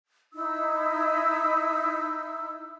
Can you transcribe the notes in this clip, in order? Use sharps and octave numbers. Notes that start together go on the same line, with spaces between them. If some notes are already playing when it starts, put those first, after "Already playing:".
D#4 E4 E6